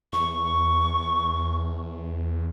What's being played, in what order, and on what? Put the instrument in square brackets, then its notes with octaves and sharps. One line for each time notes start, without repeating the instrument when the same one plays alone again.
[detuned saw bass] E2 [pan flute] C#6